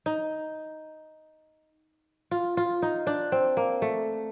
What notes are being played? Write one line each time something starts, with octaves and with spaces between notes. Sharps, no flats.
D#4
F4
F4
D#4
D4
C4
A#3
A3